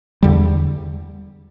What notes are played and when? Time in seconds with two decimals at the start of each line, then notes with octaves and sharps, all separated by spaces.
0.23 E2 D3 G3